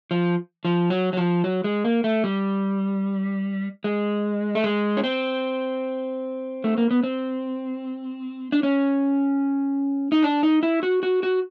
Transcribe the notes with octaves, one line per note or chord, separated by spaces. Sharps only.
F3
F3
F#3
F#3
F3
F#3
G#3
A#3
A3
G3
G#3
A3
G#3
C#4
C4
A3
A#3
B3
C4
D4
C#4
D#4
D4
D#4
E4
F#4
F#4
F#4